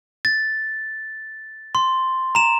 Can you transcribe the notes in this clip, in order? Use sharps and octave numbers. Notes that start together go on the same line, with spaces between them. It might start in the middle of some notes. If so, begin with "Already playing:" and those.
A6
C6
A#5 E7